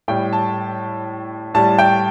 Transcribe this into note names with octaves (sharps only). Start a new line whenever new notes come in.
A2 G3 G5
A5
A2 G3 A5
G5